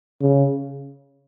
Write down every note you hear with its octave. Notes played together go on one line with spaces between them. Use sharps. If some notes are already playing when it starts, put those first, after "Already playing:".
C#3